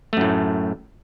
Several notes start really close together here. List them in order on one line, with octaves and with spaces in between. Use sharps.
A3 F#2 A2